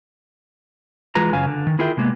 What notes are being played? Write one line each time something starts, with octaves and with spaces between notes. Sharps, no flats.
E3 G#3 F4 B4 A#5
F#2 C#3 B4 F5 G#5
D3
D#3
E4 F4 G#4 A#4 E5 G5
C3 G#3 A#3 B3